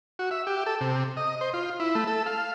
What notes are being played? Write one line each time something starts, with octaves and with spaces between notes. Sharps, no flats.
F#4
E5
G4
A4
C3
D#5
C5
F4
E4
A3
A4
F5